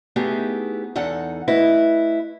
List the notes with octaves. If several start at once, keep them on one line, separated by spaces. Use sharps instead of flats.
A3 B3 D#4 E4 G4 G#4
E2 D#4 A4 F#5
A3 E4 B4 D#5